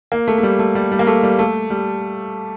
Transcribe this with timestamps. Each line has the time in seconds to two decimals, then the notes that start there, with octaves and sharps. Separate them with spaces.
0.12 A#3
0.28 A3
0.38 A3
0.43 G3
0.59 A3
0.75 G3
0.92 G3
0.99 A#3
1.07 A3
1.23 G3
1.39 A3
1.70 G3